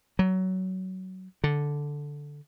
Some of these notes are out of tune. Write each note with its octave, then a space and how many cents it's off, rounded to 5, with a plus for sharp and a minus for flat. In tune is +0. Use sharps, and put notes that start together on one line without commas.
F#3 +15
D3 -5